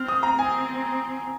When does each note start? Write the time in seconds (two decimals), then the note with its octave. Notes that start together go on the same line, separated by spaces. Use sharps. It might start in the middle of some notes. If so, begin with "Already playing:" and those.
Already playing: C4 F6
0.08 D#6
0.23 A#5
0.38 C4 G#5